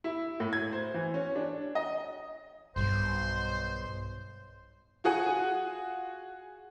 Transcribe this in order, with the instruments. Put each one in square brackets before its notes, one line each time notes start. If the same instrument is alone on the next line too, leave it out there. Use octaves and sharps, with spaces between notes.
[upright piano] E4
A2
G#6
C5
E3
C#4
D4
D#5
[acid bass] B1 [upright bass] G2 [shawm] C5 [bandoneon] C6
[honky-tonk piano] F4 F#4 G#4 F#5 G#5